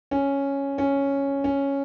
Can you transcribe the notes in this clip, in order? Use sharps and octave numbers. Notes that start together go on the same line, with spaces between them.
C#4
C#4
C#4